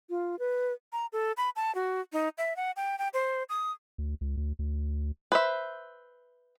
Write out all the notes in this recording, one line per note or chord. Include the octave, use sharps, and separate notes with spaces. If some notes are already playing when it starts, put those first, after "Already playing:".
F4
B4
A#5
A4
B5
A5
F#4
D#4
E5
F#5
G5
G5
C5
D#6
D2
C#2
D2
D2
B4 C5 E5